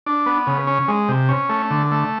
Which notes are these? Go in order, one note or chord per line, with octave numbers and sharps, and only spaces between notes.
D4
B3
C#3
C#4
G#3
C3
C#4
A3
D3
A3